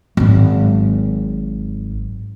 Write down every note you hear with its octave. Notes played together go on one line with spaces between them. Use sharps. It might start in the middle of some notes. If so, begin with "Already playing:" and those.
G#1 F#3